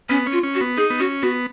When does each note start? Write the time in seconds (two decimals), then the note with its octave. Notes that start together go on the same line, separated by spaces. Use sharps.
0.09 B3 C#4
0.26 C#4
0.32 F4
0.43 C#4
0.55 F#4
0.60 B3
0.77 D#4 G#4
0.90 B3
0.99 C#4 F#4
1.22 B3 F#4